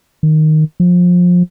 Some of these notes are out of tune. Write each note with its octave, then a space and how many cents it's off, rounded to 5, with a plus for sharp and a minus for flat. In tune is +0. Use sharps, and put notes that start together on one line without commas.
D#3 -5
F3 +25